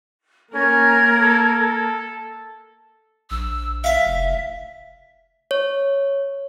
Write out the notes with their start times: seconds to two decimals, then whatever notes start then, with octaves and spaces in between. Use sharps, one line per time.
0.54 A#3 C#4 A#4 A#5 G#6
1.20 A4
1.59 A4
3.31 A#1 E6
3.84 E5 F5
4.05 F1
5.51 C#5